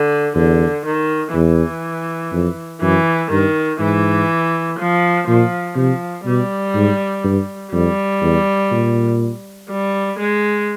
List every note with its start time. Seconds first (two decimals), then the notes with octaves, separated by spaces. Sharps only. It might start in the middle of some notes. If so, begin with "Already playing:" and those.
Already playing: D3
0.35 E2 D3
0.85 D#3
1.34 E2 E3
2.32 F2
2.81 F#2 E3
3.31 G2 D#3
3.79 G#2 E3
4.79 F3
5.28 A#2 F3
5.76 C3 F3
6.26 B2 G3
6.75 G#2
7.24 G2
7.73 F2 G3
8.22 E2
8.72 A#2
9.70 G3
10.19 G#3